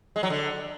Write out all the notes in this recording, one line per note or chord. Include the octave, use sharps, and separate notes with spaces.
G#3
F#3
D3